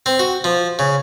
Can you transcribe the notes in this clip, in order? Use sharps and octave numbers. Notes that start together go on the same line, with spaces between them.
C4
F#4
F3
C#3